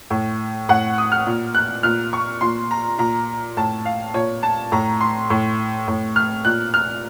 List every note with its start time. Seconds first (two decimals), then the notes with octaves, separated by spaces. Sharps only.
0.10 A2
0.69 A2 F#5
0.98 D#6
1.12 F6
1.27 A#2
1.55 F#6
1.83 A#2 F6
2.13 C#6
2.41 A#2 C6
2.71 A#5
2.98 A#2 A#5
3.57 A2 A5
3.85 F5
4.14 A#2 C#5
4.43 A5
4.72 A2 A#5
5.01 C6
5.30 A2
5.88 A2
6.16 F6
6.45 A#2 F#6
6.74 F6